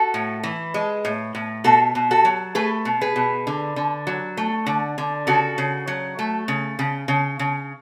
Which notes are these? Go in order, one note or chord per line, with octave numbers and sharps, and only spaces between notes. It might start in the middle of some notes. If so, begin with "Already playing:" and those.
Already playing: F#4 A4
A2
E3
G#3
A2
A2
B2 F#4 A4
B2
F#4 A4
F#3
A3 G#4 B4
B2
G#4 B4
B2
D3
D3
F#3
A3
D3
D3
C#3 F#4 A4
C#3
F#3
A3
C#3
C#3
C#3
C#3